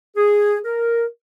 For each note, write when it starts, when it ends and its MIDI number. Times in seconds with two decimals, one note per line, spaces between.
0.17 0.59 68
0.65 1.06 70